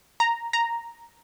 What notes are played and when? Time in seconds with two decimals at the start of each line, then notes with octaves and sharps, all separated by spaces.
0.20 A#5
0.53 A#5